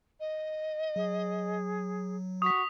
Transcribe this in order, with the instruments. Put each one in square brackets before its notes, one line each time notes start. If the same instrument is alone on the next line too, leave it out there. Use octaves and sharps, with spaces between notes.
[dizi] D#5
[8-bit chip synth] F#3 [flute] G#4
[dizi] F#4 [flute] C#6 [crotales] D#6 B6